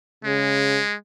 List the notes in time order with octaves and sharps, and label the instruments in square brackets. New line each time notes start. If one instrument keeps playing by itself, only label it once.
[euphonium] C#3 [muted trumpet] G#3